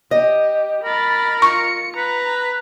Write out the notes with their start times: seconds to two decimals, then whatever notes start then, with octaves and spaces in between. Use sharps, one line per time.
0.11 G4 D#5
0.84 A#4 B5 A6
1.42 F4 C#6 C#7
1.97 B4 A#5